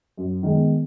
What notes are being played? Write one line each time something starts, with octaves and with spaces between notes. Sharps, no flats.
F#2
D#3 G#3 B3